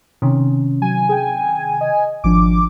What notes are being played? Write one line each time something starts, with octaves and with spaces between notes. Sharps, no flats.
C3 D#3 C#4
F#3 G#5
G#4 G5
D#5
G#1 F3 D4 D6